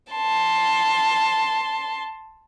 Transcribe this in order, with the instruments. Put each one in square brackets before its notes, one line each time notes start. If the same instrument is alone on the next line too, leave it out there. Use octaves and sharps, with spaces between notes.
[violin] A5 C6